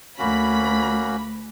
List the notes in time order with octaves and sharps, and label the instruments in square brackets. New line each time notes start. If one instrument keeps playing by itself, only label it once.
[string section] D2 B5 [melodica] A#3 C#4 F#4